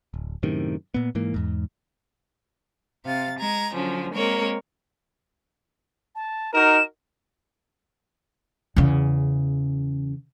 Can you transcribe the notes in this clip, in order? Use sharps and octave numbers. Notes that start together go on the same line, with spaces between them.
D1
F#2 A2 C3 D#3
A#2 B3
G#2 E3 A#3
E2 G#2
C3 F5 A6
G#3 A#5 G#6
D3 F3 F#3 C#4
G#3 A#3 C4 A#4 C#5
A5
D#4 F#4 A#4 E7
E2 C#3